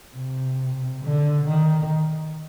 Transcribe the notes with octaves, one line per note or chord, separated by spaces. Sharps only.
C3
D3
D#3